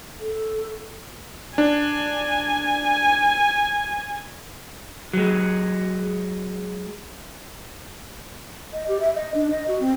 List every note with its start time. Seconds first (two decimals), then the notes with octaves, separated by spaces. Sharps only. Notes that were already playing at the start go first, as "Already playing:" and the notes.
0.21 A4
1.58 D4 G#5
5.13 F#3 G#3
8.73 D#5
8.88 G4
9.00 E5
9.15 D#5
9.34 D4
9.51 D#5
9.68 F#4
9.81 C4